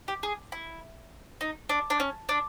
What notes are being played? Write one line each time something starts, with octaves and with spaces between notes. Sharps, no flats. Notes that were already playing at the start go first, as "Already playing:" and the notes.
G4
G#4
E4
D#4
D4
D4
C#4
D4